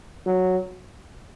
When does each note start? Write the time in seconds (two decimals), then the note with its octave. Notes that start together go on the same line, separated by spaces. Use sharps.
0.27 F#3